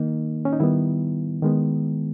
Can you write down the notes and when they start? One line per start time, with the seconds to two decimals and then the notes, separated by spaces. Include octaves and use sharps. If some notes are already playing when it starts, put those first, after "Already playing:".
Already playing: D#3 A#3 D#4
0.45 C#4
0.53 D#4
0.60 D#3 G3 B3 E4
1.42 D#3 G#3 B3